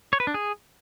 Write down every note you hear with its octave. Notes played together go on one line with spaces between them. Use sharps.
C#5
B4
D4
G#4